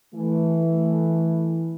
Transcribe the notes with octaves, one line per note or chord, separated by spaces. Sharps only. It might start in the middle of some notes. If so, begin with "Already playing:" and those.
E3 A3